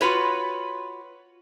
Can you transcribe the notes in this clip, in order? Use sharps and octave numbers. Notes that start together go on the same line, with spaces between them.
F4 F#4 B4 C#5